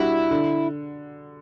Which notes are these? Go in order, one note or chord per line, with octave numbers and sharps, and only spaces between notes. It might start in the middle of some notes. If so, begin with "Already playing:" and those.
Already playing: G3 D4 E4 F#4
D3